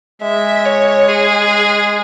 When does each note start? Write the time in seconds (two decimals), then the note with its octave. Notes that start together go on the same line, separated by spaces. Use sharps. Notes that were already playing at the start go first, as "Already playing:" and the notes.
0.22 G#3 E5
0.65 C#5
1.08 G#4